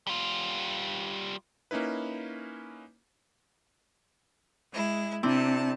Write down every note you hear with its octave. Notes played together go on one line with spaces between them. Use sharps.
G3 F4
A#3 C#4 D#4 E4 B4
G#3 E4
C3 C4 D4 E4 A5